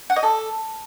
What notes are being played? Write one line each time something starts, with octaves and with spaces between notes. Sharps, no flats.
F#5
D#5
A4